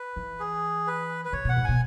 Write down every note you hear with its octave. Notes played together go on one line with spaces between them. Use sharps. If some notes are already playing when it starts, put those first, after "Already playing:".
Already playing: B4
E3
G#4
B4
B4
C#3 C#5
B2 F#5
G#2
B2 G#5